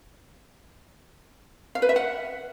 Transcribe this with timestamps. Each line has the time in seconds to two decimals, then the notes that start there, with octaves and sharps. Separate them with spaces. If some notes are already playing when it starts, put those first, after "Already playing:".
1.75 F5
1.82 B4
1.89 E5
1.96 F#5